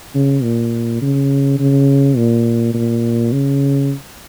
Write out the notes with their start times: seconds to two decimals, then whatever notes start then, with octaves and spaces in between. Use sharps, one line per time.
0.15 C#3
0.43 A#2
1.02 C#3
1.59 C#3
2.17 A#2
2.74 A#2
3.33 C#3